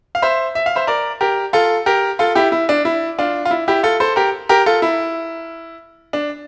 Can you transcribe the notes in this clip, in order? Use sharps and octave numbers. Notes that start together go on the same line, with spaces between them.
F5
C5 E5
E5
F5
C5 E5
A#4 D5
G4 A#4
F4 A4
G4 A#4
F4 A4
E4 G4
E4
D4
E4
D4 F4
F4
E4
E4 G4
F4 A4
A4 C5
G4 A#4
G4 A#4
F4 A4
E4
D4